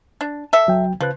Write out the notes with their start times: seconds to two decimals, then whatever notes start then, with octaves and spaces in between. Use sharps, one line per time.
0.21 D4
0.53 A4 E5
0.67 C#2 F#3 G5
1.01 C#3 F3 B4 F#6